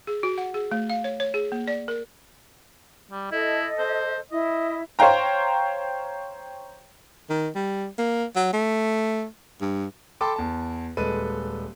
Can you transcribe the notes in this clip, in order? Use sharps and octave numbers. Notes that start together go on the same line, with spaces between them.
G#4
F#4
F#5
G#4
A3
F5
C#5
C#5
G#4
A#3
D5
A#4
G3
E4 A4 D#5
C5
E4 D#5
C5 C#5 F5 G5 A#5
D#3
G3
A#3
F#3
A3
G2
A4 G5 A5 B5 C6 D6
E2 A5
D#1 G#3 A4 B4 D#7